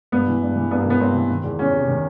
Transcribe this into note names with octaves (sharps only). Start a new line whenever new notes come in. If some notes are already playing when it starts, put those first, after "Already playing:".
G2 B3
E3
G2
E3
G2 B3
A#3
E3 B3
G2 C4
E3
D#3
E2
E2 C#4
C3
D#3